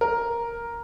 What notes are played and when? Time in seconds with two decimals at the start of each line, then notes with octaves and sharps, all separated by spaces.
0.01 A#4